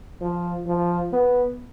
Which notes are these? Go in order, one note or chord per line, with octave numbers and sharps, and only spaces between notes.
F3
F3
B3